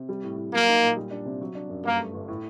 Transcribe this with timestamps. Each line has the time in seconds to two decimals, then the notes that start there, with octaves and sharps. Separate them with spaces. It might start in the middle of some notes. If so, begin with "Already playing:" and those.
Already playing: C3
0.09 G3
0.23 A2
0.37 A2
0.52 F#3 A#3
0.68 D#4
0.83 A#2
0.97 G3
1.11 D4
1.26 C3
1.41 F#3
1.55 D4
1.70 F#2
1.84 G2 A#3
2.00 A3
2.14 G1
2.28 A2